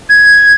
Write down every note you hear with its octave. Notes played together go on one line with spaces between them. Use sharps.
G#6